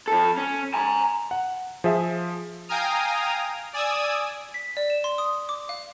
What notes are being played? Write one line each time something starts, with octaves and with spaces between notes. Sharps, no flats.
F2 A4
C#4
G#5 A#5
F#5
F3 G#4 E5
F5 G5 G#5 A#5 D#6 F6
D5 G#5 D#6 E6 G#6
B6
D5
E7
C6
D#6
D6
F5